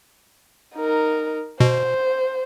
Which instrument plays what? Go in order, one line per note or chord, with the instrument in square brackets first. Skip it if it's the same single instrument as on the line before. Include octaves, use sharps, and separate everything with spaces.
[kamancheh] D#4 A#4
[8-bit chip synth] B2 [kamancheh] C5